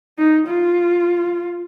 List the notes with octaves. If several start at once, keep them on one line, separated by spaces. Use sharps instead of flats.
D#4
F4